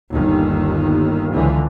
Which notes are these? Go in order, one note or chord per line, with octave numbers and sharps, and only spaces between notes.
G1 D#2 D#3
C#2 D3 E3 F3